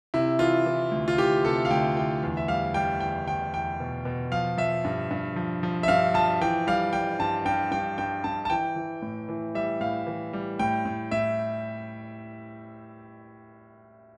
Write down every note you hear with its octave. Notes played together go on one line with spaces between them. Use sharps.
C3 E4
E3 F4
E3
D2
F4
E3 G4
C3 A4
F5
D2 G5
E3 G5
E2
E5
G3 F5
G3 G5
E2 G5
E2 G5
E2 G5
B2
B2
F3 F5
F3 E5
G2
G2
F3
F3
E5
G2 F5
F3 A5
E3 G5
G3 F5
G3 G5
G2 A5
G2 G5
G2 G5
G2 G5
G2 A5
A5
E3 G5
E3
A2
E3
G3 E5
A2 F5
E3
G3
A2 G5
A2
A2 E5